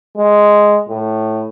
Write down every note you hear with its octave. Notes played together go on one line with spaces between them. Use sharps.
G#3
A2